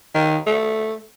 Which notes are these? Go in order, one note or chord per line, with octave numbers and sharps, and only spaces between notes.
D#3
A3